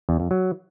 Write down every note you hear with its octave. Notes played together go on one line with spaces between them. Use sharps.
E2
F2
F#3